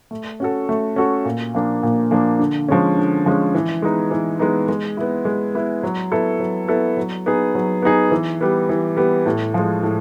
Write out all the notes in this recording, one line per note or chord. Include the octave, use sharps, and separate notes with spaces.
A3
C#4 F#4 A4
A3
C#4 F#4 A4
A#2
F3 A#3 D4
A#2
F3 A#3 D4
D3
F3 G#3 C#4
D3
F3 G#3 C#4
E3
G#3 B3 D#4
E3
G#3 B3 D#4
G#3
B3 E4
G#3
B3 E4
F#3
B3 E4 A4
F#3
B3 E4 A4
F#3
B3 D#4 G#4
F#3
B3 D#4 G#4
E3
G3 B3
E3
G3 B3
A2
F3 G#3
A2